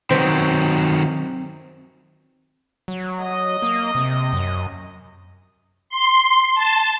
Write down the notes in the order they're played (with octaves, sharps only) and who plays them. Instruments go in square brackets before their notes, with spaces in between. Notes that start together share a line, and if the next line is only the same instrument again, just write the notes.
[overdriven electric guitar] D#3 F#3 [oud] C4 B4 C5
[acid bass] F#3
[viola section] D#5
[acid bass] A#3
C3
F#2
[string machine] C6
A5